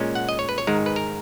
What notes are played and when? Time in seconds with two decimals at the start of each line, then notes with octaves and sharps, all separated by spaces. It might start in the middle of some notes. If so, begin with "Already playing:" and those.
Already playing: A#2 G#3 C#4
0.15 F#5
0.29 D#5
0.39 C#5
0.49 B4
0.58 C#5
0.67 G#2 D#3 G#3 A#4
0.86 B4
0.96 A#4